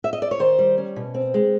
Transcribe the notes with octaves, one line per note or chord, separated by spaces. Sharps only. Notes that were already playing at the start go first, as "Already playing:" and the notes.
E5
D#5
D5
C#5
D#3 C5
G3
C#4
B2
C4
G#3